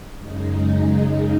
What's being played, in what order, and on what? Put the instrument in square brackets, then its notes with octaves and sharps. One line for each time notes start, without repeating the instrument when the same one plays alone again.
[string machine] F#2 C#3 G#3 D#4